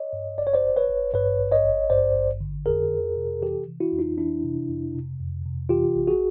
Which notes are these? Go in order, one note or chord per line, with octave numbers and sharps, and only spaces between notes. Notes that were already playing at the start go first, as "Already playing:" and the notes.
Already playing: C#5 D#5
G2
G#1 D5
C#5
C5 D5
G#1
B4 C#5
G#1
G2 B4 C#5
G#1
C#5 D#5
G#1
G2 C5 D5
G#1
D3
F2 G#4 A#4
F2
C3
E3 G4 A4
E3
E4 F#4
F2
D#4 F4
E3 D4 E4
C3
F2
C3
F2
C3
E3 F4 G4
A1
F#4 G#4